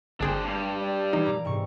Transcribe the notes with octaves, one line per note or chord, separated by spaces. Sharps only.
G1 D4 G#4 C5 G5
G2 G3
D5
E3 D#4
A#2 A#5 D6
G#2 C3 C#6